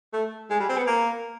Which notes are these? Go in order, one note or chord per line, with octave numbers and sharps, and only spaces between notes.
A3
G#3
G3
C4
B3
A#3